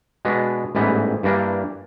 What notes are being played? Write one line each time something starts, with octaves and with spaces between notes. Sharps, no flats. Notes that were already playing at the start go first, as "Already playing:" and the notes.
B2 G#3 B3 D4
A1 G#2 E3 G3 B3
G2 E3 G3 A#3 D4